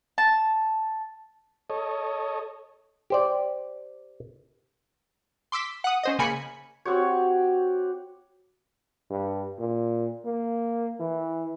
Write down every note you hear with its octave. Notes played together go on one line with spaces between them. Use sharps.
A5
A4 C#5 D#5
G4 C5 D5
C6 D6 E6 B6
F#5 D#6
C#4 C5 D#5
C#3 A#3 G#5 B5 C#7
C4 F#4 G4 C#5
G2
A#2
A#3
E3